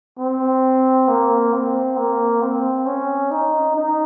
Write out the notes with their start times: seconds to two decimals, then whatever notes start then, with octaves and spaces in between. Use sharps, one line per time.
0.18 C4
1.08 A#3
1.53 C4
1.97 A#3
2.42 C4
2.86 C#4
3.31 D#4
3.75 D#4